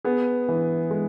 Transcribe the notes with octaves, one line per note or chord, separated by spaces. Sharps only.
B3 G#4
E3
G#3